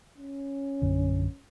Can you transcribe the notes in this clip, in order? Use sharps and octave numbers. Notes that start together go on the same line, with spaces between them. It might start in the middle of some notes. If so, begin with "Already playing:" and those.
C#4
A#1 F#2 D3